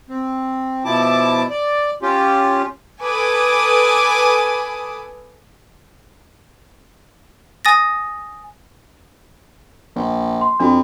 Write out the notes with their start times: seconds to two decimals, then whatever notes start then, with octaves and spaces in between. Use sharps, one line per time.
0.09 C4
0.85 B2 F3 E4 A5 D6
1.50 D5
2.02 C#4 F4 G4
3.00 A4 B4 G#5 D6 D#6
7.65 G#5 D#6 A6 A#6
9.96 A#1
10.41 C6
10.60 F2 D4 F#4